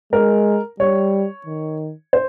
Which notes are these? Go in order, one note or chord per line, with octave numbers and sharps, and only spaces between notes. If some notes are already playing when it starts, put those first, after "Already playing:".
G#3 A#4
G3 C#5
D#3
C5